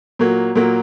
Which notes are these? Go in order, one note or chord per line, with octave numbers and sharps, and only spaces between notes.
A#2 F#3 A#3
A#2 F#3 A#3